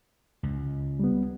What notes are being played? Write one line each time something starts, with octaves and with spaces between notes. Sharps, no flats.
C#2
G3 B3